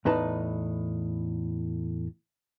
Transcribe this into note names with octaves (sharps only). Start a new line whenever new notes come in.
E2 A2 D#4 B4 A5 A#5